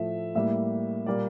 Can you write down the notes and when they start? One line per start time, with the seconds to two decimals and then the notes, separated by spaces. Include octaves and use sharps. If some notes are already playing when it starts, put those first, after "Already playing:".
Already playing: A2 F3 A3 E5
0.35 A2 G3 A#3 E5
1.06 A#2 G3 A#3 D5